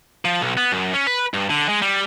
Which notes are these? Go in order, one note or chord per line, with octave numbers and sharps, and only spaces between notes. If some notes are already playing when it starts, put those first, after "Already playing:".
F3
B1
B3
F#2
C#4
B4
G2
D3
G#3
G3